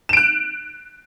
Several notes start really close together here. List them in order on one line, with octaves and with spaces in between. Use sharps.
E7 D7 F#6